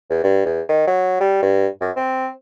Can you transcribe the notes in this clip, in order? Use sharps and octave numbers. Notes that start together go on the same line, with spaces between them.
E2
G2
E2
D#3
F#3
G3
G2
F#2
C4